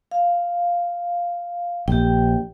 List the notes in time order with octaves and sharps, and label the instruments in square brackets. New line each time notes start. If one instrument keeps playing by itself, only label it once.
[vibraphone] F5
[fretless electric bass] A#1 [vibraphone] G4 G5